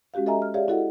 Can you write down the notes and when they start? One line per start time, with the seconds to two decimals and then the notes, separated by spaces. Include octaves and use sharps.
0.14 G#3 C#4 F#4 G4 F5
0.26 A4 D#5 E5 G#5 A#5
0.42 F6
0.54 G4 G#4 C#5 D5 E5 F5
0.68 E4 F#4 A4 D#5 F#5